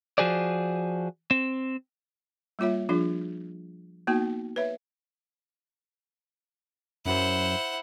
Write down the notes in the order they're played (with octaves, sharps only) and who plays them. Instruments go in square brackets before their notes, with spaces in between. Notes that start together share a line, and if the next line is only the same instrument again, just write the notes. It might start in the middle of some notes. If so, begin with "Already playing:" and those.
[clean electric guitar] F3 F#4 G#4 C5 D5
C4
[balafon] G3 A#3 F4 C#5 E5
F3 D4 F4 G#4
A#3 B3 D#4 F#4 G5
B4 C#5 E5
[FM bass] F#2 [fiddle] E4 [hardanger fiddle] C5 F#5